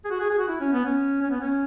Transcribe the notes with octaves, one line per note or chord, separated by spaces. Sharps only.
G#4
F#4
G#4
G#4
F#4
E4
C#4
B3
C#4
C#4
B3
C#4